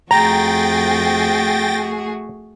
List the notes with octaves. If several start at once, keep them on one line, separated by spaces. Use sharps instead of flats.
F2 A3 F#4 G#4 G5 A#5 A6 A#6